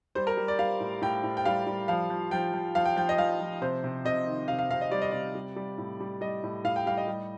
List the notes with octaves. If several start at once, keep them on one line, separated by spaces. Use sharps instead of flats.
G3 C5
A#4
G3
D5
G3 F5
A2
A2 G5
A2
G5
G3 F5
G3
F3 F5
F3
F3 G5
F3
F3 F5
G5
F3 G5
D#5
F3 F5
F3
C3 C5
C3
C3 D#5
D#3
C3 F5
F5
C3 F5
D#5
G3 D5
D#5
C3 D5
G3
G3
A2
G3
G3 D#5
A2
A2 F5
G5
G3 F5
D#5
G3